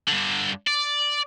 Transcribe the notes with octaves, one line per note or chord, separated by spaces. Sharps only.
G2 D3
D5